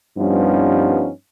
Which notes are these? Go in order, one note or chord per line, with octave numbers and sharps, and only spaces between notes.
G2 F3 G3 B3 C#4 D#4